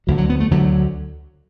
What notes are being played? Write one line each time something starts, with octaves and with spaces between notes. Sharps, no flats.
D2 D3 F#3
F#3
B3
A3
D2 D3 F#3